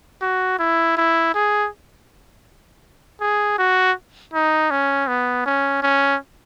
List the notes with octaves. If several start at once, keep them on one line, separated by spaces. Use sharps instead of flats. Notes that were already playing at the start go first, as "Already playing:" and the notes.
F#4
E4
E4
G#4
G#4
F#4
D#4
C#4
B3
C#4
C#4